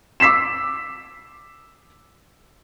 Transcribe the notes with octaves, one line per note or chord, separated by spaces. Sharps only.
D6 E6 B6 C7 E7